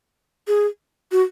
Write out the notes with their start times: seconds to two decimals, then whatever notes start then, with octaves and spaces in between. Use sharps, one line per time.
0.48 G#4
1.12 F#4